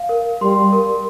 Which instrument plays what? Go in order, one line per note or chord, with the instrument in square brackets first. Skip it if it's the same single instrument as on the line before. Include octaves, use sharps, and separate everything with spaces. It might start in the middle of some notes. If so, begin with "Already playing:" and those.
Already playing: [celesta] F5
A#4
[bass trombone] G3 [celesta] C6
[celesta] A#4